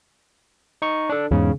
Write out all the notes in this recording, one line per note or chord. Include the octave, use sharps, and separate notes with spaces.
D#4 C#6
D4 A4
E2 G#2 C#3